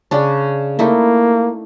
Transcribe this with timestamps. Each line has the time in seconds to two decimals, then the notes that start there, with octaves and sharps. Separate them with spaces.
0.11 C#3 C#4 D4
0.79 A3 A#3 D#4 E4